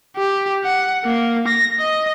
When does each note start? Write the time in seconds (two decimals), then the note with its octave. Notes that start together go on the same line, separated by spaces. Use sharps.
0.17 G4
0.64 F#5
1.04 A#3
1.48 A#6
1.80 D#5